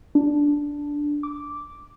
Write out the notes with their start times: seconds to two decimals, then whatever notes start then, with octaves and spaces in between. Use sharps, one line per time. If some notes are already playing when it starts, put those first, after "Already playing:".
0.15 D4
1.23 D6